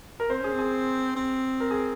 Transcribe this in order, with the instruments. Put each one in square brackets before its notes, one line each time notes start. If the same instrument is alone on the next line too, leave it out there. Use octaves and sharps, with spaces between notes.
[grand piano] A#4
[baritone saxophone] C4 [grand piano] C5
[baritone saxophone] C#4 [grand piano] G#4
[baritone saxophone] C4
[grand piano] G#4
[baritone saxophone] C4
[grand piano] A#4
G#4